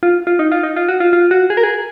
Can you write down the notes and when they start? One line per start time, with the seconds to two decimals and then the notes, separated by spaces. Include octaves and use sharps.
0.03 F4
0.27 F4
0.39 D#4
0.52 F4
0.63 D#4
0.76 F4
0.88 F#4
1.00 F4
1.13 F4
1.31 F#4
1.50 G#4
1.57 A#4
1.64 G#4